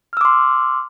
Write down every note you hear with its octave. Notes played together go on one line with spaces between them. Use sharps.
C6 D6 E6 F6